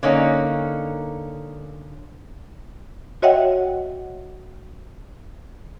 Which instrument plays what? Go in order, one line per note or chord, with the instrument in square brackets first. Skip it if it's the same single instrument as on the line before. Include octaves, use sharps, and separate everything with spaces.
[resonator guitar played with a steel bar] D3 A#3 C#4 D#4
[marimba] F#4 C#5 D#5 E5 F#5 G5